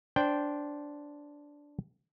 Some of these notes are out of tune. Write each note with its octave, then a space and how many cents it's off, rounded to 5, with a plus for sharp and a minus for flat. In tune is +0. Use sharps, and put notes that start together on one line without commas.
D4 -10 C5 +0 G5 +0